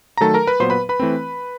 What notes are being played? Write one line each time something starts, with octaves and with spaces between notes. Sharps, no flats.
A#5
D#3 F#3 A3 A4 A5
A#4 A#5
B4 B5
A#2 F#3 B3 C5 C6
B4 B5
B4 B5
E3 A3 C4